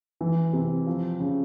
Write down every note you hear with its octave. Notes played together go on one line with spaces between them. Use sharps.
E3
C3
F3
C#3